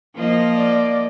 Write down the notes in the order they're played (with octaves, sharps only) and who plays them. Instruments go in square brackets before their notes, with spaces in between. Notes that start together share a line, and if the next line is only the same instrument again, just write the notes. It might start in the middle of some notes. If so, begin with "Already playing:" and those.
[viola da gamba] F3 A#3 D#5
[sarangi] D5